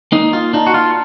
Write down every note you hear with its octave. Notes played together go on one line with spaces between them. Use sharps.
A#3 D#4
F4
D4 D#4
F#4
F4